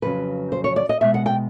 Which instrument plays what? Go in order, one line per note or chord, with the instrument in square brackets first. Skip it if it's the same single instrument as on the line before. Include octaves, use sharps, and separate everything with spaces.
[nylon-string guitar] F2 C#3 F#3 B4
C5
C#5
D5
D#5
B2 G#3 E5
F#5
G5